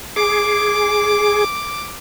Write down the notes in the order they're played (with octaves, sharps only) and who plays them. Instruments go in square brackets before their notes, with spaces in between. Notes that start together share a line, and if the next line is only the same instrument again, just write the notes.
[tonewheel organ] G#4 [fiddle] D6